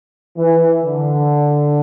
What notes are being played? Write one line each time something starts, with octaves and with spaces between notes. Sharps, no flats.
E3
D3